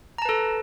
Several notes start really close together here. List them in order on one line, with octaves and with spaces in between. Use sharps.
A#5 A5 B4 A4